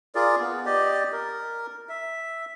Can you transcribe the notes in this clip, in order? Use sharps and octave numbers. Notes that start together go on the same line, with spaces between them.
F4 G#4 A#4 D5
B3
G4 D5 D#5
A#4
E5